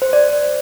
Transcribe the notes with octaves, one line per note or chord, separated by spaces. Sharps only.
C5
D5